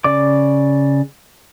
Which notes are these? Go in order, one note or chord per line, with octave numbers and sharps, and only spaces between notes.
C#3 D5 D6